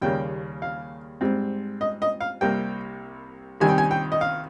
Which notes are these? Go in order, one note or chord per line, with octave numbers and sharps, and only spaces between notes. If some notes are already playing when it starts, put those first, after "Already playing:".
D#2 C#3 G3 A#3 G5
F5
G#2 G3 C4
D#5
D#5
F5
C2 C3 G3 A#3 G5
C2 C3 D#3 G3 G#5
G5
G#5
G5
D#5
F5